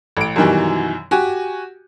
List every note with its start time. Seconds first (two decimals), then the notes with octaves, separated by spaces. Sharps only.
0.17 A1 D7
0.36 F#2 B2 D#3 E3 G3
1.11 F#4 G4 G#5